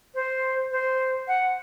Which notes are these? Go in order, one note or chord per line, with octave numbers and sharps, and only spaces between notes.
C5
C5
F#5